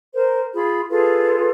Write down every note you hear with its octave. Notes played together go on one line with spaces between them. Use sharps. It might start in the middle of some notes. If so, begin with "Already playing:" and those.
A#4 C5
F4 G#4 B5
F4 G#4 A4 B4